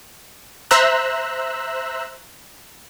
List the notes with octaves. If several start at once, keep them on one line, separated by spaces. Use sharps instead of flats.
C5 E5 A#5 E6 F#6